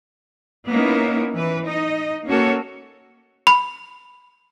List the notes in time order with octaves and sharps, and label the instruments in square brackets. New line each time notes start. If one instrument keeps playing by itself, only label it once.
[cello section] A#3 B3 C#4 D#4 E4
E3 B4
D#4 D#5
A#3 C#4 F#4 A4 C#5
[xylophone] B5